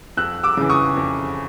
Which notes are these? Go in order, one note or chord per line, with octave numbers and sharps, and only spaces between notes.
F2 E6 F#6
D6 E6
C#3 E3
C#6 D#6
F2